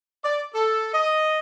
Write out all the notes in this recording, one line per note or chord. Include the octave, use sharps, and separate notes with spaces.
D5
A4
D#5